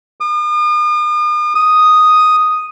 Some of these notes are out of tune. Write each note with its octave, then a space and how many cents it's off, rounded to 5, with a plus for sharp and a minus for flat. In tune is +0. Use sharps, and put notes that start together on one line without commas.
D#6 -45
D#6 +0